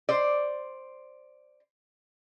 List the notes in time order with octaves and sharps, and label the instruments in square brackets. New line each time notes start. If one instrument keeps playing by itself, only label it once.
[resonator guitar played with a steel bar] C5 D5